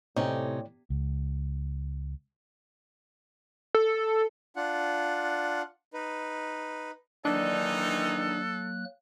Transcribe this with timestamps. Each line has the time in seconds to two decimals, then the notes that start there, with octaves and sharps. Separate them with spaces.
0.16 A2 C3 C#4 D#4 C#5 D5 G5
0.90 C#2
3.75 A4
4.56 D4 F4 F#5
5.93 D#4 B4
7.25 D#3 E3 F#3 A#3 D4 D#4 A4 F#6